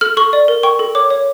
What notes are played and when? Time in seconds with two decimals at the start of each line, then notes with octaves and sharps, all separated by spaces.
0.01 A4 F6
0.17 A4 C#6
0.33 D5
0.48 A#4
0.63 G5 C#6
0.79 A4
0.95 C#5 D6
1.10 C#5